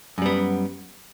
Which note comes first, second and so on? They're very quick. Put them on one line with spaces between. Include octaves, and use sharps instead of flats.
F#2 G3 B3